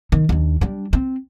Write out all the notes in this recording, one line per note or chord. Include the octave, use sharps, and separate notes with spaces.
D#3 D#4
D#2 D4
G3 D4
C4